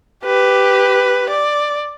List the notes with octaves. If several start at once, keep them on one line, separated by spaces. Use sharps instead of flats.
G4 B4
D5